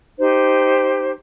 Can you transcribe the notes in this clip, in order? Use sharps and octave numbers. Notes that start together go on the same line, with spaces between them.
D#4 G4 C5